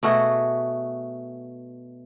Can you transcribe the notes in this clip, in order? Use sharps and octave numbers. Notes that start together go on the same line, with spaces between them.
B2 A3 F#4 G#4